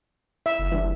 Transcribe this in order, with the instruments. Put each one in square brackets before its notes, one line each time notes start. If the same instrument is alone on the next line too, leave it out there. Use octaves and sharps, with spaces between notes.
[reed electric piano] E4 [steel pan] E5
[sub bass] F#1
[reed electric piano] E3 G3 D4